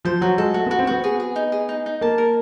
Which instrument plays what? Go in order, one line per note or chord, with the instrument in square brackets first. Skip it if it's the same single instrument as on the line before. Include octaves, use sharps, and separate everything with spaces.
[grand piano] F3 [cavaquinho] C5
[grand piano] F#3 [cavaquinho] F#4
[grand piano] G#3 [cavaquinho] A4
[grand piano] A3 [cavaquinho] F#4
[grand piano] B3
[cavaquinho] F#4
[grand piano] C4
[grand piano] B3 [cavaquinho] F#4
[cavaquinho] G#4
G#4
D#4
G#4
D#4
D#4
[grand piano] A#3 [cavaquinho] A5
[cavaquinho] A#4